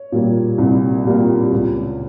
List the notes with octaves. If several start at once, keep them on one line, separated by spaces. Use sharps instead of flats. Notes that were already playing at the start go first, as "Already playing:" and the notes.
Already playing: C#5
A#2 G3 A#3
C2
A#2 G3 A#3
C#2